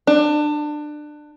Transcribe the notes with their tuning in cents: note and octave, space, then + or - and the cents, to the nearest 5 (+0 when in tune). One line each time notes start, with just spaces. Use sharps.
D4 +25